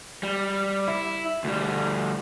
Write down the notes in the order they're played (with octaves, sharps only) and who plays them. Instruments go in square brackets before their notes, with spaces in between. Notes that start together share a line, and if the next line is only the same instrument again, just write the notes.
[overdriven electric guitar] G3
E4
D2 G3